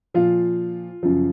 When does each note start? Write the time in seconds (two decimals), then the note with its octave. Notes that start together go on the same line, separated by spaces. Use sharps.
0.14 A#2 F3 F4
1.03 F#2 C#3 F3